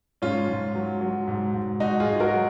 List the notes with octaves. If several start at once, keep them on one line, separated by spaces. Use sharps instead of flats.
G#2 C#4 F4
G#2
F#3
F#3
G#2
G#2
G#2 D#4 F#4
F4 G#4
G#2
F#4 A#4
F#3